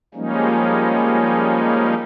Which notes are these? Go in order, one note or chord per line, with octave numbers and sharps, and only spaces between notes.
F3 G3 G#3 A#3 C#4 D#4